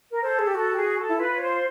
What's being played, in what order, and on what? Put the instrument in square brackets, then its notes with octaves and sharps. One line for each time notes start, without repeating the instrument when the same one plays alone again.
[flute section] A#4
[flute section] A4 [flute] C5
[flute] G#4
G4
[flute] F#4 [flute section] A4
[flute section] G4
G#4
A4
[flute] E4
[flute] F4 [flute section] B4
[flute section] C#5
C5